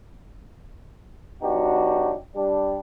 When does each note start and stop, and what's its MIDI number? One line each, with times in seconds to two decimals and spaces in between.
1.42 2.14 54
1.42 2.14 59
1.42 2.14 62
1.42 2.14 63
1.42 2.14 66
1.42 2.14 67
2.36 2.79 55
2.36 2.79 62